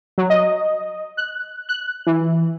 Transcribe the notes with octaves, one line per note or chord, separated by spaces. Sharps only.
F#3
D#5
F#6
F#6
E3